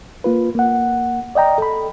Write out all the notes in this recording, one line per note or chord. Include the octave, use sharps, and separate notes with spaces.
A#3 F4 B4
A#3 F#5
D5 D#5 G5 A#5
A4 B5